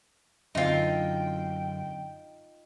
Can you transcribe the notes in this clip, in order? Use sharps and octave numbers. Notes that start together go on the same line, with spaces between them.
F#2 D3 C4 D#4 F4 G5